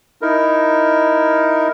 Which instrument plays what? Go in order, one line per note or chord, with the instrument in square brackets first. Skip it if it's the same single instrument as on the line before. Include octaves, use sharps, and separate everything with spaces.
[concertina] D#4 E4 A#4